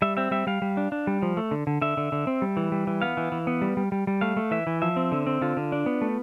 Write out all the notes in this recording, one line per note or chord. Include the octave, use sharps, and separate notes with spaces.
G3 E5
C4 E5
G3 E5
G3 F5
G3
D4
D4
G3
F3
A3
D3
D3
D3 E5
D3
D3
C4
G3
E3
G3
E3
B3 F5
E3
E3
B3
G3
G3
G3
G3
A3 F5
A3
E3 E5
E3
F3 E5
C4
D3
C4
D3 F4
D3
D4
B3
A3